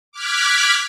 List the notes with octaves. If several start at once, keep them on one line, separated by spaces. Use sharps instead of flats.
D6 F6 F#6 G#6 B6